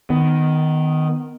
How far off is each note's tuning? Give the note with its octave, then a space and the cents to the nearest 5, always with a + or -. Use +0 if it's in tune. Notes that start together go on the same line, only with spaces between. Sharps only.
D#3 +0 B3 +20